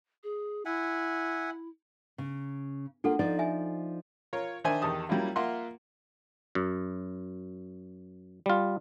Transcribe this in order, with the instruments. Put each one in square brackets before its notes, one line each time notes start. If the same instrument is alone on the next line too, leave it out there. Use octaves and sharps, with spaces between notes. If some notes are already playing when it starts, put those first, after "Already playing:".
[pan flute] G#4
[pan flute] E4 [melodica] E5 F#5 G#5
[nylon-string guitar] C#3
[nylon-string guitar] A#3 F4 [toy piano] D4 A4 F#5
[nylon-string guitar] F3 D#4 D5
[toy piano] E5 G#5
[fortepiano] F4 A#4 C#5
D#3 D4 C5 E5 G#5
E2 D#3 G4 A5 D#6
F#3 G3 A#3 C#4 E4 F4
A#3 F4 E5 F#5 C6
[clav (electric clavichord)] F#2
G3 F4